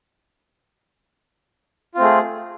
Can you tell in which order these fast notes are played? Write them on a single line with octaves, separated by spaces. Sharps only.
F4 C4 A3 G#4